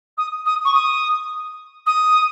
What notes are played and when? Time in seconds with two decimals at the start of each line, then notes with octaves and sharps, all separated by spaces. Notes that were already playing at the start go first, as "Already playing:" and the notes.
0.17 D#6
0.45 D#6
0.65 C#6
0.74 D#6
1.86 D#6